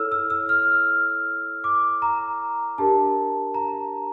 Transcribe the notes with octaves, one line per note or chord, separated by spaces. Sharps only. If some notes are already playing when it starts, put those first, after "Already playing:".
Already playing: E4 A4 C#5 E6 F6
E6
E6
F6
D6
A#5
D4 G4 A#4 A5
A#5